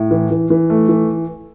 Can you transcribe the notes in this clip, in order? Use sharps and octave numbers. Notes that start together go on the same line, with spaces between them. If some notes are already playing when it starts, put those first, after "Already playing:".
Already playing: A2
E3
E3
E3
A3
E3